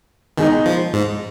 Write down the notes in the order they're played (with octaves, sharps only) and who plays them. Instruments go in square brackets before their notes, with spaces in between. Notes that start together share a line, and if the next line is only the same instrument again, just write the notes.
[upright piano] B2 G#3 D#4 [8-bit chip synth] D#3
[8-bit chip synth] F3
G#2